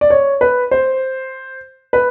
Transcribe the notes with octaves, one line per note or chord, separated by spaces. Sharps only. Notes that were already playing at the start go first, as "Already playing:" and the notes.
D5
C#5
B4
C5
B4